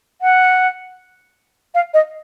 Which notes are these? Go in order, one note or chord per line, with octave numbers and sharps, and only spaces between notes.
F#5
F5
D#5